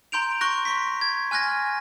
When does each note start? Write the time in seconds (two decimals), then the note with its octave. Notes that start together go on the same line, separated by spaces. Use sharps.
0.12 A#5 C6 G6 D7 F7
0.41 C6 C#6 F#6 A#6
0.65 C6 C#6 B6
1.01 G#6
1.31 G#5 F6 F#6 G#6 A#6